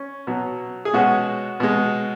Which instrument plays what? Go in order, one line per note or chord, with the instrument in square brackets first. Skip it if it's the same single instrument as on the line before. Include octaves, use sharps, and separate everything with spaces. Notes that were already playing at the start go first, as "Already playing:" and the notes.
Already playing: [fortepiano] C#4
B2 F#3
G#4
B2 G#3 C#4 F#4
B2 G#3